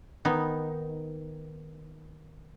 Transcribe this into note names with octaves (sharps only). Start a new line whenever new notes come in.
D#3 B3 D#4